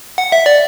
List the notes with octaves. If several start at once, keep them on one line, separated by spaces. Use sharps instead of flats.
F#5
E5
D5